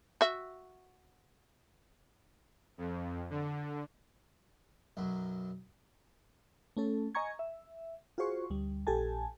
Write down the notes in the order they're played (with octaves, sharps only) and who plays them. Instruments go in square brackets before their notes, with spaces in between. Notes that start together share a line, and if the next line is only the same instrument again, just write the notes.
[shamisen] F#4 E5
[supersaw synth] F2
D3
[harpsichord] B1 F#2 F#3
[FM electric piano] A3 C#4 A4
D#5 G#5 A#5 C#6 G#6
E5
F4 F#4 G#4 C5 C#6
D2 G3
A#1 A#2 G4 A4 G#5 A5